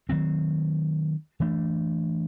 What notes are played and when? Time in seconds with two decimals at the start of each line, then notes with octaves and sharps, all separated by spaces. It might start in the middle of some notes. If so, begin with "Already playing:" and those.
0.09 D#3 F#3 A3 C4
1.40 E3 A3 D4